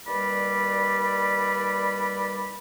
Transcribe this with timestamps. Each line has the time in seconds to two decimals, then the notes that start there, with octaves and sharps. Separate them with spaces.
0.07 D#2 G3 B4 D5 B5